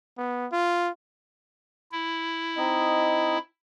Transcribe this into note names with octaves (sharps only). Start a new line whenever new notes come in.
B3
F4
E4
C4 D#4 D#5